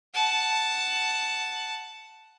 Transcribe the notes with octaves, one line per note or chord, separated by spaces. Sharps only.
F#5 A5